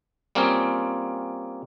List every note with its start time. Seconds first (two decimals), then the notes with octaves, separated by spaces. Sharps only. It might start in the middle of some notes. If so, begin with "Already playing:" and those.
0.35 G3 A#3 C4 C#4 F4 G#4